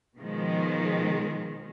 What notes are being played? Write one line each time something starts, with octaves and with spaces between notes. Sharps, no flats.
B2 D#3 F3 G#3